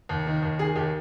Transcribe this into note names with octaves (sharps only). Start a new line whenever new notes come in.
D#2
D#3
D#2
D#3 G#4
D#2 G4